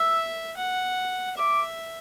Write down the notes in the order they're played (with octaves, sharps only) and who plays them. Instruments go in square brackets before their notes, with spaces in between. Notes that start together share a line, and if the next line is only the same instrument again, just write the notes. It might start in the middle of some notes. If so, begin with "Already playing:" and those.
Already playing: [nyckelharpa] E5 [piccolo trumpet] E6
[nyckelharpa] F#5
[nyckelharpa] E5 [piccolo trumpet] D6